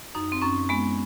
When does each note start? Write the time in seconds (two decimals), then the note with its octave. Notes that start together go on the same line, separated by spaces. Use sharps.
0.15 F#2 D#4
0.32 C4
0.42 F#2 C#4
0.69 G#3 B3